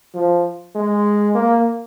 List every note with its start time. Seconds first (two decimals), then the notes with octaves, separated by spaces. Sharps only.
0.14 F3
0.75 G#3
1.35 A#3